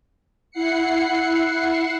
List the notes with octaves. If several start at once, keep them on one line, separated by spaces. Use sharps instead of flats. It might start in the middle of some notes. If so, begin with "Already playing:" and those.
E4 F#5 C7 C#7